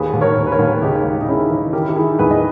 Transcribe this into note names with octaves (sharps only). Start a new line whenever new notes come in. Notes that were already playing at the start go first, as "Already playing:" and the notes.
Already playing: D#2 G#4 B4
D#2
A#4 C#5
D#2
B4
A#4 C#5
D#2
C#3 D#4 G4
D#2
D#4
C#3 C#4 E4
E3
D#3 G4 A#4
E4
G4
D#3 E4 G#4
E2 G#4 B4
D#5